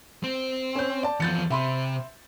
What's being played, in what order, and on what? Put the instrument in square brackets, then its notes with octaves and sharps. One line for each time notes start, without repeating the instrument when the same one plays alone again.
[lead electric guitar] C4
[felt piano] C#4 G6
D5 A5
[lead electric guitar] E2 F3 [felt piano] G6 A6 C#7
[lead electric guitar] C3 [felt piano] E5 B5 C6